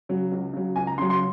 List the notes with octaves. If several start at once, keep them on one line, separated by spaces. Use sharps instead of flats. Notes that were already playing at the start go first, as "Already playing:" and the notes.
C#3 F#3
C#2
C#3 F#3
C#2 G#5
A#5
C#3 F#3 C6
C6